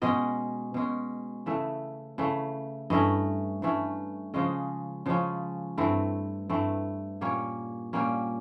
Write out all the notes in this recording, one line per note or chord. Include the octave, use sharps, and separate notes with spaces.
B2 G#3 C#4 D#5
B2 G#3 C#4
C#3 E3 A3 E5
C#3 E3 A3
G2 E3 A3 C#4 D#5
G2 E3 A3 C#4
C#3 F3 G#3 C#4 D#5
C#3 F3 G#3 C#4
G2 E3 A3 C4
G2 E3 A3 C4
A#2 G3 A#3 C#4 C#5
A#2 G3 A#3 C#4